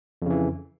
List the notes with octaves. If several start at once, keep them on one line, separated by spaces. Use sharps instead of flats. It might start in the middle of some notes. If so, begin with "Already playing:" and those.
F2 C#3 E3